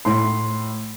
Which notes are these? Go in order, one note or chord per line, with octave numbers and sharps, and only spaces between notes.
A2 C6